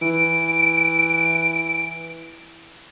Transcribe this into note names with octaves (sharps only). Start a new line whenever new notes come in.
E3 D7